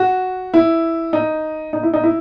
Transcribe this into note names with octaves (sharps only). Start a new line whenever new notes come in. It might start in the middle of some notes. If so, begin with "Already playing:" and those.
Already playing: F#4
E4
D#4
D#4
E4
D#4
E4